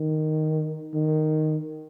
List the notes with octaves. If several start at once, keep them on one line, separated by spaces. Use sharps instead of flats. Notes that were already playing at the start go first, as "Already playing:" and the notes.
Already playing: D#3
D#3